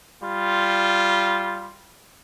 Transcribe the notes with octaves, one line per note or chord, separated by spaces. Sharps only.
G3 F4